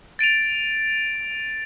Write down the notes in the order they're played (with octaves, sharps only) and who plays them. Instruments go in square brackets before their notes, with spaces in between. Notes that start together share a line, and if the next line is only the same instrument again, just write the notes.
[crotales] A6 D7 D#7 F7